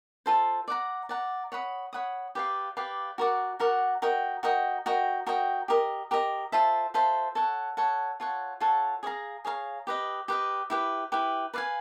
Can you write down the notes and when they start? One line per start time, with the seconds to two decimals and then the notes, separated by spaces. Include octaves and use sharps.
0.26 F4 A4 C5
0.68 D5 F#5 A#5
1.09 D5 F#5 A#5
1.52 C#5 F#5 B5 D#6
1.93 C#5 F#5 B5 D#6
2.35 G4 B4 D5 F5
2.77 G4 B4 D5 F5
3.18 F#4 A#4 D5 F#5
3.60 F#4 A#4 D5 F#5
4.02 F#4 A#4 D#5 G5
4.43 F#4 A#4 D#5 G5
4.86 F#4 A#4 D#5 G5
5.26 F#4 A#4 D#5 G5
5.68 G4 A#4 D#5
6.11 G4 A#4 D#5
6.52 F4 A4 C5 E5
6.94 F4 A4 C5 E5
7.35 A4 C#5 F#5
7.77 A4 C#5 F#5
8.20 F4 A4 C#5 F#5
8.60 F4 A4 C#5 F#5
9.03 G#4 C#5 F5 A#5
9.45 G#4 C#5 F5 A#5
9.87 G4 B4 D#5
10.28 G4 B4 D#5
10.70 E4 G4 B4
11.12 E4 G4 B4
11.54 B4 D5 F5 G#5